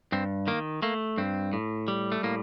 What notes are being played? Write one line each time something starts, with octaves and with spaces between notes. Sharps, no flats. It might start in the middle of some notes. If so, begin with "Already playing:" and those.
G2 C4
D#3 A#3
A3 A#3
G2 C4
A2
G3
A3
A2 A#3